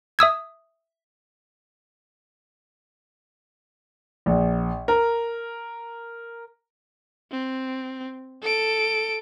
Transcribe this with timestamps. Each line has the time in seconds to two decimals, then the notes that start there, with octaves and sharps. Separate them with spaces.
0.19 E5 D#6 E6 G#6
4.26 A#1
4.88 A#4
7.31 C4
8.42 A4 D7